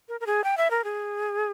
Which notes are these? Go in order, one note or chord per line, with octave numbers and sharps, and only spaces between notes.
A#4
A#4
G#4
G5
E5
A#4
G#4